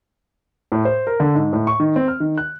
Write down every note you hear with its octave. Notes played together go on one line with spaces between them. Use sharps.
A2
C5
A#4
D3
G#2
A2
C#6
D#3
C4
F6
D#3
F#6